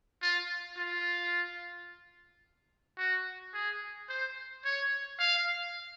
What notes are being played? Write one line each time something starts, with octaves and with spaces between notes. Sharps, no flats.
F4
F4
F#4
G#4
C5
C#5
F5